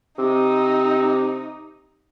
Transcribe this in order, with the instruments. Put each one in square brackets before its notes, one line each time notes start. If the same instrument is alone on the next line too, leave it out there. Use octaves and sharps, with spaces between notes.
[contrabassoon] C3 [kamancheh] D#4